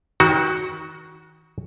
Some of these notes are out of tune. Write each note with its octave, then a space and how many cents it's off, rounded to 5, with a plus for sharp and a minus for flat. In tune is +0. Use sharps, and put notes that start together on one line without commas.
D#3 +35 F#4 +0